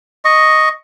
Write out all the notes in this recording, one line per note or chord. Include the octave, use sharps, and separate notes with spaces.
D#5 C#6